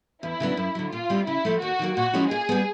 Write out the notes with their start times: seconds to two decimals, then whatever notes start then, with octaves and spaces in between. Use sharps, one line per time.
0.23 E2 E4
0.40 C#3 F#3 B3 D4
0.57 F#2
0.75 D3 F#3
0.92 A#2 F4
1.10 G3 C4 E4
1.27 C#3 E4
1.45 F3 A3
1.62 D#2 F#4
1.79 D#3 F#3 A#3
1.97 A#2 F#4
2.14 F3 G#3 C#4 E4
2.31 A#2 G#4
2.49 G3 B3